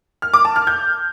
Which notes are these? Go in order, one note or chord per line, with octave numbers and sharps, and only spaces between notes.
F6
D6
A5
F6
G6